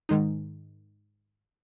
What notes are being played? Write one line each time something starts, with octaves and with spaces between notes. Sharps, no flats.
G#2 D#3 G#3 D#4